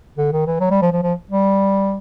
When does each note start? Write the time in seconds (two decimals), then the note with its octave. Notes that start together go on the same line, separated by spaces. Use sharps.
0.18 D3
0.32 D#3
0.46 E3
0.60 F#3
0.71 G3
0.82 F3
0.92 F3
1.03 F3
1.31 G3